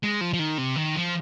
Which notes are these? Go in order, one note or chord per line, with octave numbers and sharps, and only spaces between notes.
G#3
F3
F3
D#3
C3
D#3
F3